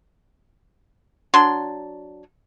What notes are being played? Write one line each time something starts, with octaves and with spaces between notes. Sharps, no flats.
F#3 D4 C6